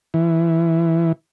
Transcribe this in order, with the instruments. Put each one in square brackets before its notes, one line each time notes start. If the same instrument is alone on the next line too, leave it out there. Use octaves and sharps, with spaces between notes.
[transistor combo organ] E3